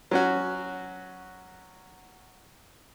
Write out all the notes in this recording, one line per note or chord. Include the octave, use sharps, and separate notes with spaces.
F#3 C#4 F#4